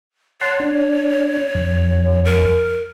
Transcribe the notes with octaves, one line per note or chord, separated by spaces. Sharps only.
C#5 F#5 A5 C6
D4
F2
A#4